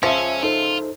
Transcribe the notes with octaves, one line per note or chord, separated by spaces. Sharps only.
C#2 F3 C#4 E5
D#4 F4 A4 C5